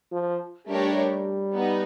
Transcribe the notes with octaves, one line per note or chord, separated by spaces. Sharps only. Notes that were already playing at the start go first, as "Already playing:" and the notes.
F3
G3 A3 D4 G4 A#4 C#5
B3 D#4